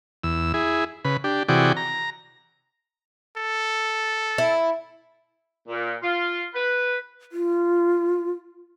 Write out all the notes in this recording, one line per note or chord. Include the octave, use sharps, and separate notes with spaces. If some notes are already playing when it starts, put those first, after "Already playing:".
E2 E6
E4 G#4
C#3 B4
D4 G4
C3 E3 F#4 G#4 D5 G5
A#5
A4
E4
A#2
F4
B4
F4